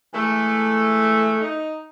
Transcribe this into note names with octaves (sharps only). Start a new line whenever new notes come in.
E3 G#3 A3
D#4